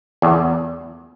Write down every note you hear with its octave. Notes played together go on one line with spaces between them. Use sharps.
E2